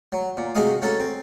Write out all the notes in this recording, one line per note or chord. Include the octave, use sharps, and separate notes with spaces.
F#3
A#2
C3 F#4 G#4 D#5 F5 D#6
A#3 C#4 F#4 A4
C4